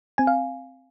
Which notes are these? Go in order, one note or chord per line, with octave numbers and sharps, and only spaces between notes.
C4 G#5
F5